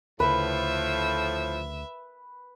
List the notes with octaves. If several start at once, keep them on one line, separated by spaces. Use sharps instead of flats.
D2 A2 C#3 F3 B4 E5